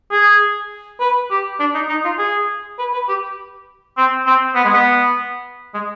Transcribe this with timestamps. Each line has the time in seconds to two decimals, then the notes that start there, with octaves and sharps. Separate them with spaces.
0.12 G#4
1.00 B4
1.31 G4
1.60 D4
1.74 D#4
1.89 D#4
2.04 F4
2.19 G#4
2.79 B4
2.93 B4
3.08 G4
3.97 C4
4.27 C4
4.55 B3
4.65 G#3
4.74 B3
5.74 G#3